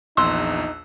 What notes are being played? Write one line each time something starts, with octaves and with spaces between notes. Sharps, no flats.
A#1 E2 D#4 C6 E6 F#6